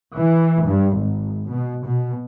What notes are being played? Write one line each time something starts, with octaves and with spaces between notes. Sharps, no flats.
E3
G2
G#1
B2
B2